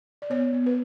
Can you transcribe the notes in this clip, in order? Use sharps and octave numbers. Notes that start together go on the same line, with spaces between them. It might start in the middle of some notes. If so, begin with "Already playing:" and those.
D5
B3 C#5
B3
B4